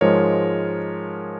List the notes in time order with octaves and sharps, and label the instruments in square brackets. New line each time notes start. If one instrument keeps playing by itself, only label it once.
[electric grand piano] G#2 F3 G#3 A#4 C#5